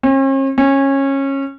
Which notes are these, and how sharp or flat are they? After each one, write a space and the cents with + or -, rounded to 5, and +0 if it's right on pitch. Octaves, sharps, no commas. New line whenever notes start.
C#4 -45
C#4 -20